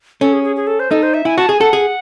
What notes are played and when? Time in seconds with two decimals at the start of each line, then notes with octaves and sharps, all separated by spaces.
0.21 C#4 A4
0.33 G#4
0.44 G#4
0.56 G#4
0.67 A4
0.80 C5
0.90 D#4 A4
1.03 C5
1.14 E5
1.25 E4 G#5
1.38 F#4 A5
1.49 G#4 G#5
1.61 A4 F#5
1.73 G#4